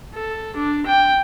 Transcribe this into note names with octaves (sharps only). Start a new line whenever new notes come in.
A4
D4
G5